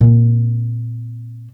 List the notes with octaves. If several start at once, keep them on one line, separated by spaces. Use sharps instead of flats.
A#2 C4